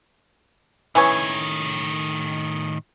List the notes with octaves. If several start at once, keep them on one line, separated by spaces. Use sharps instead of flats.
A2 D#3 E3 C#4 C#5